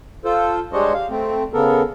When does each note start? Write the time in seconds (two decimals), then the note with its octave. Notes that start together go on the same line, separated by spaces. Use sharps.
0.25 F4 A4 C5
0.73 G3 G#3 D4 C5 C#5 D#5
0.94 F5
1.10 A3 C4
1.53 C#3 B3 A4 A#4